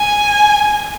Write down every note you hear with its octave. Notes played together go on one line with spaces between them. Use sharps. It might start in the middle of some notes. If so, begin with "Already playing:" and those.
Already playing: G#5